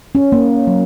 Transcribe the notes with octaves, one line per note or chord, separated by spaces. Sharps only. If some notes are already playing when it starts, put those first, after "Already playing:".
C#4
A#3
F#3